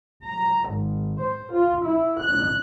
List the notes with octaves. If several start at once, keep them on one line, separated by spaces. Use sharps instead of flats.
A#5
G#1
C5
F4
E4
F#6